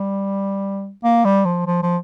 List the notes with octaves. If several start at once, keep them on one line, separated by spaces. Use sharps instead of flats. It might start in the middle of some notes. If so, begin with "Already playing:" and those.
Already playing: G3
A#3
G3
F3
F3
F3